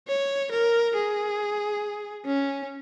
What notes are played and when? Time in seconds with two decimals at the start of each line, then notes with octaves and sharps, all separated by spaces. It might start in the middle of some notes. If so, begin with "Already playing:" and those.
0.08 C#5
0.52 A#4
0.95 G#4
2.26 C#4